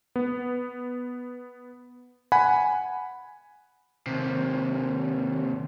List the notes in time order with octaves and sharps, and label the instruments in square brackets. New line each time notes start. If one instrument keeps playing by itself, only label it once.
[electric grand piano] B3
F#5 G#5 B5
[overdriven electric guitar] D#2 C3